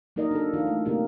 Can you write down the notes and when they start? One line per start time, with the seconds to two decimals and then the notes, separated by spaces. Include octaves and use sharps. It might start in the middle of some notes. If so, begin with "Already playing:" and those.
0.16 F#3 A#3 D#4 A#4 D5 D#5
0.31 D4 A4
0.54 E3 D#4 F4
0.67 A3
0.85 C3 A3 A#3 G4 A#4